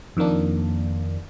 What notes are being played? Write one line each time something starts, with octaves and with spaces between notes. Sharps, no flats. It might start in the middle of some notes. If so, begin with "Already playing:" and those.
F2 D#3 F3 A#3 D4